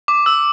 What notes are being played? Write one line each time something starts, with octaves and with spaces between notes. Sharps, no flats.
D6
E6